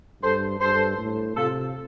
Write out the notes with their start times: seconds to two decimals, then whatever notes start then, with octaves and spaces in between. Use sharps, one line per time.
0.23 G2 A4 C5
0.60 G2 A4 C5
0.98 A2
1.37 C3 F4 A4